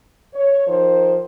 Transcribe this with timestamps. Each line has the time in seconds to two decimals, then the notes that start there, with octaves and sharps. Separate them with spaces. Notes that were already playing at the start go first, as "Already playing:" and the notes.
0.33 C#5
0.67 D#3 F3 A#4 C5